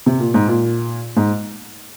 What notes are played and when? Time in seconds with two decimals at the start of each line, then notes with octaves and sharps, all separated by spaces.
0.06 C3
0.19 A#2
0.34 G#2
0.48 A#2
1.17 G#2